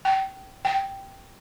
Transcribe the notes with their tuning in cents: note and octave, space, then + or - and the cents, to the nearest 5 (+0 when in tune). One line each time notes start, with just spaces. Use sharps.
G5 -25
G5 -5